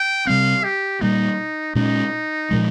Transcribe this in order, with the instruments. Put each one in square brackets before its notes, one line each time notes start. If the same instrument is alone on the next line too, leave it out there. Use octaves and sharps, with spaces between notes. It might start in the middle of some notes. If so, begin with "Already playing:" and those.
Already playing: [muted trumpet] G5
[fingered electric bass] C3 G3 C4 [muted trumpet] F5
[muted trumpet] G4
[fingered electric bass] A#2 G3 A#3 [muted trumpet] D#4
[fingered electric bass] A#2 G#3 C#4 [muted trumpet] D#4
[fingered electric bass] A#2 F3 G#3